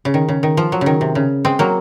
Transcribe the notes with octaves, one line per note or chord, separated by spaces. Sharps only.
C#3
D#3
C#3
D#3
F3
F#3
C#3
D#3
C3
C#3
G#3 C4
F#3 A#3